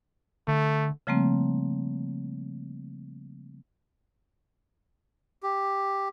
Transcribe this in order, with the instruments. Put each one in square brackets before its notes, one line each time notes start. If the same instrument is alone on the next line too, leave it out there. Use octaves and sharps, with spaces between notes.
[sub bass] D3 [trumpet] A3
[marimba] C#3 F3 G3 A3 A#3 C4
[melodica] G4